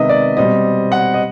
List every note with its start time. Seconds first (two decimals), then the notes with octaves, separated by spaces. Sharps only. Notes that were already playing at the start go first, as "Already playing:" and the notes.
Already playing: C3 D#3 G#3 B3 D#5 E5
0.09 D5
0.37 B2 G3 C4 D#5
0.92 F#5
1.14 D#5